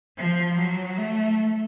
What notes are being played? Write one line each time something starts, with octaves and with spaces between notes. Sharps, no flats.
F3
F#3
A3